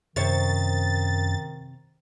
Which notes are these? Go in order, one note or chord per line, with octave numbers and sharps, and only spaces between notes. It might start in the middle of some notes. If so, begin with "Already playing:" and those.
F#2 C3 D#3 C5 C#5 A6